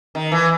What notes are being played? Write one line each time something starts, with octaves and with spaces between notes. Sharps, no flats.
D#3
E3